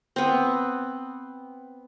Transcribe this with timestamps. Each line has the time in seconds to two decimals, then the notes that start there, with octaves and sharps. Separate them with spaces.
0.16 B3 C4